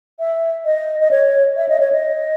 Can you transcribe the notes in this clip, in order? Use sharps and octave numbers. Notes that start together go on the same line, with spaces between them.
E5
D#5
D#5
C#5
E5
D#5
C#5
D#5